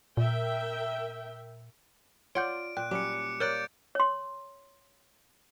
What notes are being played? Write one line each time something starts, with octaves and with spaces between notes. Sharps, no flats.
A#2 A#4 E5 G5
F4 C#5 D5 F#5 G6 D7
A#2 G5 F#6
F#3 G3 C#4 D6 C#7
C#7
A#3 A#4 C#5 D5 F#6 G6 A6 D7
C#5 C6